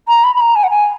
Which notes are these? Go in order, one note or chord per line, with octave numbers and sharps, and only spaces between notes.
A#5
B5
B5
A#5
G#5
F#5
G#5